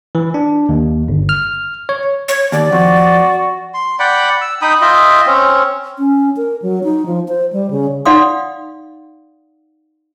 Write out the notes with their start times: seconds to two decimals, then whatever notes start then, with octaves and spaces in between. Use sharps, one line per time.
0.15 E3
0.34 D4
0.69 D#2
1.08 G1
1.29 F6
1.89 C#5
2.28 C#5
2.52 D#2 D5
2.72 F2 F#4
3.74 C6
3.99 D5 F#5 G5 B5
4.41 E6
4.62 D#4 G5 B5 D#6
4.81 F4 D#5 E5 G5
5.26 C4 C#4
5.99 C#4
6.37 A#4
6.62 F#3
6.84 D#4
7.06 F3
7.28 C5
7.53 G3
7.70 C#3
8.05 D#4 D5 F5 F#5 C6 D#6